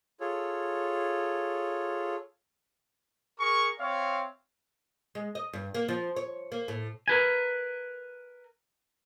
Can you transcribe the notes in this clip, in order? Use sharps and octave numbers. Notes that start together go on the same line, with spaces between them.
F4 G#4 A4 C#5
G#4 A#4 C#6
C4 C#5 E5 F5
G#3
D#5
G2
A#3
F3
C#5
A#3
A2
A#4 B4 G#5